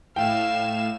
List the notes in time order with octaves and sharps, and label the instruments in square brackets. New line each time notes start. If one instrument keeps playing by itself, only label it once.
[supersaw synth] A2 E7 [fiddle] E5 F5 [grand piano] G5